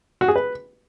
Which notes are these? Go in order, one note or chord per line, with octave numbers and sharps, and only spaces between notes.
F#4
G#4
B4